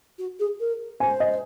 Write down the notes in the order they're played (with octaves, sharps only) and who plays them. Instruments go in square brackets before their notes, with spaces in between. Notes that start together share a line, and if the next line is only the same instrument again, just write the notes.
[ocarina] F#4
G#4
A#4
[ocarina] C5 [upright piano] G#5
[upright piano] D#5